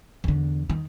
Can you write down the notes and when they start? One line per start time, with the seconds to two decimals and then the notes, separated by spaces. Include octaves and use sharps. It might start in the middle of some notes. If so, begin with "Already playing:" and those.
0.24 E2 D3
0.70 D#3